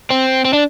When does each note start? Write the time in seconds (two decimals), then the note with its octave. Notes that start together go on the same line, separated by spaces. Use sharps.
0.10 C4
0.45 C4
0.53 D4